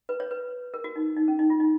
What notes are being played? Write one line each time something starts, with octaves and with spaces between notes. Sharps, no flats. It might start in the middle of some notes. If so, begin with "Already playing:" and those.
B4
C#5
B4
A#4
F#4
D#4
D#4
C#4
D#4
F4
D#4